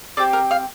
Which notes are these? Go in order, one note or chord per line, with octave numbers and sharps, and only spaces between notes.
C4 G4 D5
A#4
F5